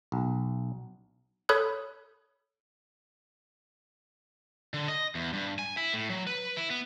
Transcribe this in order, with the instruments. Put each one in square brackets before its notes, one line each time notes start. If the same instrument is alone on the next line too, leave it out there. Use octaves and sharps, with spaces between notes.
[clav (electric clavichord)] B1
[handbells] A4 C#5 B5 D#6 F#6 G6
[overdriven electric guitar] D3
D#5
E2
G2
G#5
E4
A2
F#3
B4
E4
B3